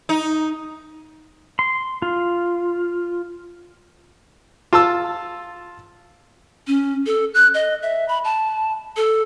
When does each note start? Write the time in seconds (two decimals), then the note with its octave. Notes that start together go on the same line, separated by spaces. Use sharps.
0.09 D#4
1.59 C6
2.02 F4
4.73 F4 A5 E6
6.67 C#4
7.06 A4
7.34 F#6
7.54 D#5
7.83 E5
8.08 B5
8.25 A5
8.97 A4